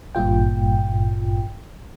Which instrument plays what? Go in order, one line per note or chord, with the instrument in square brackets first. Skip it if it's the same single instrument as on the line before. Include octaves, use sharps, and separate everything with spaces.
[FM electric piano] G#1 G2 A#2 F4 G5